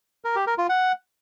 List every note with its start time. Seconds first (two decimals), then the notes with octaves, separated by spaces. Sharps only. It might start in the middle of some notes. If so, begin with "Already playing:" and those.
0.25 A#4
0.36 G4
0.47 A#4
0.58 F4
0.69 F#5